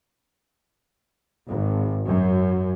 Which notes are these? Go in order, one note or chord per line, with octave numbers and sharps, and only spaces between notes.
G#1
F#2